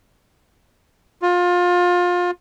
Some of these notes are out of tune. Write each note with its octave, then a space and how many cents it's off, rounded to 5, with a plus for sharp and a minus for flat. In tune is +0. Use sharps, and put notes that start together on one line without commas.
F4 +25